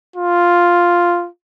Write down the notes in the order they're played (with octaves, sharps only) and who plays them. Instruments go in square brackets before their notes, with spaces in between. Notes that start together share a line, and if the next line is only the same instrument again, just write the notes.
[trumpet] F4